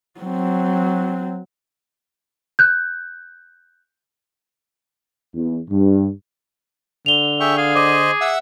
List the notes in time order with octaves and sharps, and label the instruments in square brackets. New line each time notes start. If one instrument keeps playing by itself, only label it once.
[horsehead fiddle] F#3 C4
[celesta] F#6 G6
[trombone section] E2
G2
[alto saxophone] D3 [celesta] F7 G7
[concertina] G#4 G5 C#6 [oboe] E5
[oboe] G#4 [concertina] F5
[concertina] C5 D#5 [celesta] D6 D#7
[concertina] E5 F#5 E6